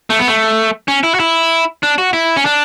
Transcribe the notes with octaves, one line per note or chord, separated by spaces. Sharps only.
A3
B3
A3
C#4
E4
F#4
E4
D4
F#4
E4
C#4
D4